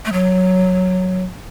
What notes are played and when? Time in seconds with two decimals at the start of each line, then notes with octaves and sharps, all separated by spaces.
0.06 A3
0.12 F#3